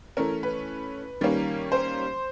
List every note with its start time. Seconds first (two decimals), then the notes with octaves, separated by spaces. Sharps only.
0.17 E3 A3 C#4 A#4
0.43 B4
1.21 D#3 G3 A#3 C#4
1.72 C5